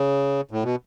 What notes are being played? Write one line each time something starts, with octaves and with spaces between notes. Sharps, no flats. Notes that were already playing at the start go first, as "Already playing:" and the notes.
Already playing: C#3
A2
B2